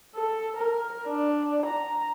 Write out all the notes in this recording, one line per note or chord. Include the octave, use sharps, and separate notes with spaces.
A4
A#4
D4
A#5